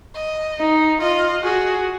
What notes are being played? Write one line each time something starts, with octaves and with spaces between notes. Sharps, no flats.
D#5
D#4
F4 D#5
F#4 G#4